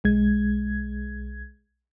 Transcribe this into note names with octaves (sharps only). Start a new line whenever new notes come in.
B1 G#3 G#6